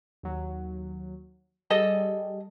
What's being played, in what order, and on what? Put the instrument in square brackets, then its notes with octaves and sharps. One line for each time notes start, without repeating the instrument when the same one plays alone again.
[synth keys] D#2 F#3
[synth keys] G3 [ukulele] G#4 A4 D#5